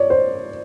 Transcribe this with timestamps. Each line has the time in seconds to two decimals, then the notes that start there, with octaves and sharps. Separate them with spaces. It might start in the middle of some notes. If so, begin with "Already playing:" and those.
Already playing: C#5 D5
0.10 C5